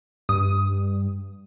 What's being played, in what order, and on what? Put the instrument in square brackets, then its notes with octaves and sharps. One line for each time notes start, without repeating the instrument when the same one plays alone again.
[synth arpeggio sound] G2 D#6